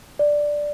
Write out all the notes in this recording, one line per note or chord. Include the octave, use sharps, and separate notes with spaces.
D5